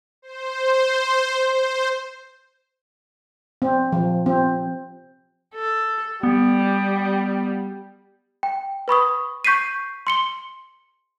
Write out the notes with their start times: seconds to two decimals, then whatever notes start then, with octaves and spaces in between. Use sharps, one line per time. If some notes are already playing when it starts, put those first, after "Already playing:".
0.22 C5
1.53 C5
3.62 C4
3.92 F3
4.26 C4
5.54 A4
6.23 G3 B3
8.43 G5
8.88 B4 B5 C#6 D#6
9.45 C#6 G6 B6 C7 D#7
10.07 C6 C#7 G7